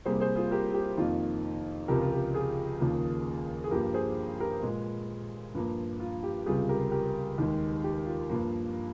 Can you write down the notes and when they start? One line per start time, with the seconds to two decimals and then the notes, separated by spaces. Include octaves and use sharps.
0.05 C2 C3 G3 A#3 G#4 C5
0.20 G#4 C5
0.36 F4 G#4
0.51 G4 A#4
0.74 G4
0.97 F2 D#3 A#3 F4
1.88 C#2 C3 F3 G4 A#4
2.01 F4
2.12 G4
2.34 F4 G#4
2.80 D#2 C#3 F3 A#3
3.64 G#4
3.71 G2 F3 A#3 G4 A#4
3.94 G#4 C5
4.40 G4 A#4
4.63 A#2 G#3
5.55 G2 F3 A#3
6.00 F4
6.23 G4
6.46 C#2 C3 G3 F4 G#4
6.69 G4 A#4
6.91 G4 A#4
7.38 D#2 D#3 G#3
7.84 G4
8.06 F4
8.30 G2 F3 A#3